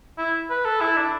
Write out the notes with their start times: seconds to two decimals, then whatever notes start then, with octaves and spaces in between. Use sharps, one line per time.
0.18 E4
0.50 B4
0.65 A4
0.81 E4
0.97 D4